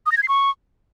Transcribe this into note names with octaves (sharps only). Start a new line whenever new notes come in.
D#6
A#6
G#6
C7
C#6